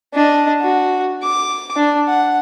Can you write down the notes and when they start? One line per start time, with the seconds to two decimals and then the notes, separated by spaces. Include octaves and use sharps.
0.14 D4 D#5
0.61 F#4
1.23 D6
1.76 D4
2.07 F#5